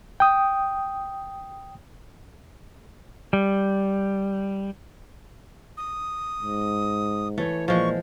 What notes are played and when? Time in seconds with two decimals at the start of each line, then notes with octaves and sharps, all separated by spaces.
0.20 G5 D#6
3.33 G3
5.77 D#6
6.42 G#2
7.38 E3 A3 C#5
7.68 A#2 F3 G#3 C#6